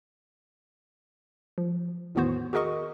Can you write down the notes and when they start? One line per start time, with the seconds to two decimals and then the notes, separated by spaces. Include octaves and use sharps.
1.58 F3
2.15 E2 A2 D#3 B3 F#4 C5
2.53 F#4 G#4 A#4 D#5 C#6 D#6